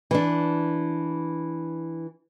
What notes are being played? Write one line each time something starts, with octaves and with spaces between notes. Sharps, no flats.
E3 D4